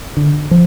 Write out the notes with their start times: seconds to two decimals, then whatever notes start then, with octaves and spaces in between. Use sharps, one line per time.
0.17 D3
0.51 F3